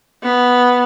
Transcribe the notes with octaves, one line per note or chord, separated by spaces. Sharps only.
B3